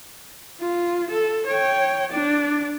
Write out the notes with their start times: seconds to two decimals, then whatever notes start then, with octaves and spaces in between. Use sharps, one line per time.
0.60 F4
1.10 A4
1.46 C#5 G5
2.11 D4 D5